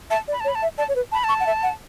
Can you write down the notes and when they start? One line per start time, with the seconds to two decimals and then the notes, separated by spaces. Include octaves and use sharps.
0.10 E5 A5
0.28 D5
0.33 B5
0.40 A5
0.44 C#5
0.48 B5
0.55 A5
0.62 E5
0.78 D5 A5
0.88 C#5
0.95 B4
1.12 A5 B5
1.24 A5 C#6
1.40 F#5
1.46 E5
1.63 F#5